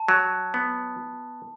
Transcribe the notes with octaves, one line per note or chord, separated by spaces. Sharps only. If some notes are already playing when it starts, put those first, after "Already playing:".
Already playing: A5
F#3
B3